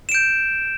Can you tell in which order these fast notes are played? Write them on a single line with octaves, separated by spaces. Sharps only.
E7 D7 G6